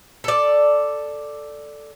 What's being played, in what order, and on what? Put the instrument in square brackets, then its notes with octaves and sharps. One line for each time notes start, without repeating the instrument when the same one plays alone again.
[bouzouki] A4 D5